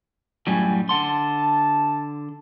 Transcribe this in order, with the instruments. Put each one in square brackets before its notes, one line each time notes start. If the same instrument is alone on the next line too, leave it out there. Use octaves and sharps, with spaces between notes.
[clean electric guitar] F#2 A2 G3 [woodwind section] F#4 G#5
[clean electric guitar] D3 F#5 C6 [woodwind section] A5